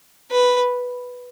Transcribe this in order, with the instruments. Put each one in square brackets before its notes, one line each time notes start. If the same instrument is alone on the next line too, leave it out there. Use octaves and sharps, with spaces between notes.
[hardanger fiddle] B4